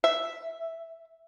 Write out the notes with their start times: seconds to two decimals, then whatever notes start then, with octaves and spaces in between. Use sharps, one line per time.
0.04 E5